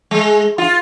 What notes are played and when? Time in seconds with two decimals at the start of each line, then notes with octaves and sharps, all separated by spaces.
0.11 G#3
0.58 F4